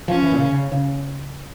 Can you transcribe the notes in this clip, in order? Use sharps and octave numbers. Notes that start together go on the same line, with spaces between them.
F3 C#4
E3
A#2
C#3
C#3
C#3